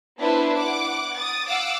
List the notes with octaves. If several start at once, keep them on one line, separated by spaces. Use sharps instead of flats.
B3 D4 E4 B4 C5
F#5 D6
D#6 A6
F5 F#5 D6 E6